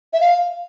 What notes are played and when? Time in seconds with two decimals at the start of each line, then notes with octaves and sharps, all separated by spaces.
0.13 E5
0.21 F5